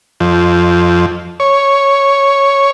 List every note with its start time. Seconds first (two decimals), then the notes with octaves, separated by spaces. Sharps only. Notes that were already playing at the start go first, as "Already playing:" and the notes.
0.20 F2
1.40 C#5